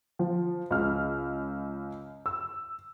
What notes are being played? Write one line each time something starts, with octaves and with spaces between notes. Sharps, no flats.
F3
C#2 F6
E6